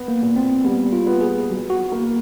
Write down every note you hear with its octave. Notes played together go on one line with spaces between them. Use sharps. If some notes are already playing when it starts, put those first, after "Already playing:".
Already playing: B3
A#3
A#2
C4
G3 B3
F4
B3
G#4
F#3
F#4
A#3